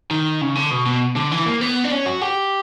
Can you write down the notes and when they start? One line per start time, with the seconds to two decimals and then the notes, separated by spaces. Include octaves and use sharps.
0.11 D#3
0.41 C#3
0.55 D3
0.71 B2
0.86 B2
1.16 D3
1.31 E3
1.46 A#3
1.61 B3
1.84 D4
1.91 C#4
2.06 F#4
2.21 G4